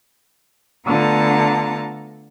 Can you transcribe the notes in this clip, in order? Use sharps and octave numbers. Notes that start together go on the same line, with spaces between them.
D3 A3 B3 F4 A5 A#5